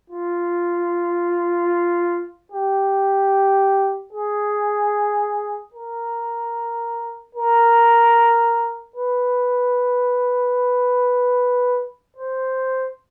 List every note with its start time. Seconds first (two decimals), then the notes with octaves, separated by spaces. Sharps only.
0.10 F4
2.52 G4
4.13 G#4
5.74 A#4
7.35 A#4
8.96 B4
12.17 C5